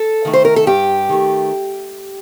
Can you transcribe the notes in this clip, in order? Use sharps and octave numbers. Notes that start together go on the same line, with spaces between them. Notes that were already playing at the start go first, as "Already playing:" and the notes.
Already playing: A4
D#3 A3
C5
A#4
A4
G2 G4
D#3 A3